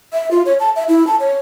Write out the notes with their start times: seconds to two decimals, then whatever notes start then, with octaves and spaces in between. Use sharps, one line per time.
0.13 E5
0.31 F4
0.46 C#5
0.60 A5
0.76 E5
0.88 E4
1.07 A5
1.20 C#5